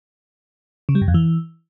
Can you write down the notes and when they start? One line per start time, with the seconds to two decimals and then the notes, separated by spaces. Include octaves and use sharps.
0.89 C#3
0.95 G3
1.02 G2
1.08 F2
1.14 E3